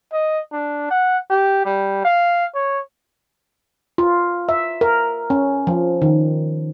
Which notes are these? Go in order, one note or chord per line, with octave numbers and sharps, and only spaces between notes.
D#5
D4
F#5
G4
G3
F5
C#5
F4
E5
A#4
C#4
F3
D#3